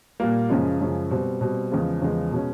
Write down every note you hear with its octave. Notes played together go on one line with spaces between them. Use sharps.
A#2 G3 A#3
F#2 C#3 F3 G#3
F#2 C#3 F3 G#3
B2 G3 C4
B2 G3 C4
E2 C#3 F3 G#3
E2 C#3 F3 G#3
B2 G#3 C#4